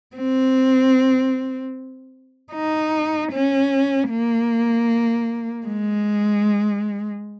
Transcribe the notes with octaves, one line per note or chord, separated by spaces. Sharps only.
C4
D#4
C#4
A#3
G#3